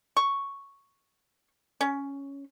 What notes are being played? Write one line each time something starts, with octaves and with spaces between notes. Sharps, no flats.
C#6
C#4